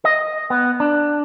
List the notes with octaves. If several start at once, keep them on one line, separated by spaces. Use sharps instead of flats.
D#5
B3
D4